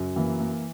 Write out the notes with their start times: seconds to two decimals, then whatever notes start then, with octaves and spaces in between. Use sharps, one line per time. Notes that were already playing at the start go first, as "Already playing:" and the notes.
Already playing: F#2 C#3
0.16 E3 A#3
0.40 A#3